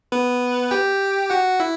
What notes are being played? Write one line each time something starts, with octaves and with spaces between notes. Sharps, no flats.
B3 B4
G4 G5
F#4 F#5
E4 E5